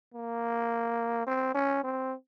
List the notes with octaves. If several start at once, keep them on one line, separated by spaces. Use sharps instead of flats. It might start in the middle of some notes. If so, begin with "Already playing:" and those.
A#3
C4
C#4
C4